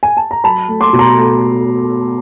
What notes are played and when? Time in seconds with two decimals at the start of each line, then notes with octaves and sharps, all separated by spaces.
0.03 G#5
0.17 A5
0.31 A#5
0.44 F#3 A5 B5
0.68 A3
0.81 C6 D6
0.93 B2
0.99 A#5 C6
1.17 A3